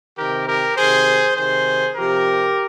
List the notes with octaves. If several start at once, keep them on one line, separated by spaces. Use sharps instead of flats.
C3 D#3 G4 A#4
G4 A#4
C3 D#3 G#4 C5
C3 D#3 G#4 C5
C3 F3 G4 A#4